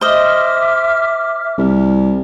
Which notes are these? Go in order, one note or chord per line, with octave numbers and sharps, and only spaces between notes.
C5 D#5 E5 D6 F6
C2